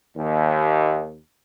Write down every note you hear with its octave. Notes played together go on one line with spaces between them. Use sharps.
D#2